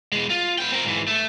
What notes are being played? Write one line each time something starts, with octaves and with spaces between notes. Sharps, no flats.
E2 G#3
F4
B3 G5
C4 A#4
G#2 E3
A3